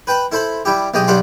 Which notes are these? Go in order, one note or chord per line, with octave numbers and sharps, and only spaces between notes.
B4 G5 A5 B5
E4 A4 C5 B5
G3 E4 G4
B1 G#3 G4 G5 D#6
B1 G3 G4 F#5 C6 D6